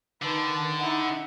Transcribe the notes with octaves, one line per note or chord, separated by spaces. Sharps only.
D3 D#3 B4 A5
D#4 E4 F#5